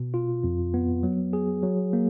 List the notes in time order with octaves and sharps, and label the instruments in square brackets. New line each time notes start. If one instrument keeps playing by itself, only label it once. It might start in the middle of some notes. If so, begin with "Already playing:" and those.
Already playing: [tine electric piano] B2
F4
F2
B3
F#3
G#4
F#3
A#3